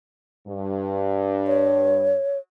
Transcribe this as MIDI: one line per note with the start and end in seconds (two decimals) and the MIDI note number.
0.47 2.15 43
1.47 2.38 73